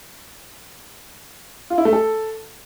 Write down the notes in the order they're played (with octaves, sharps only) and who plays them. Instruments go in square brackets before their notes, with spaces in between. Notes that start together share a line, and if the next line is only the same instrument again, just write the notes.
[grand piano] F4
E4
A3
A4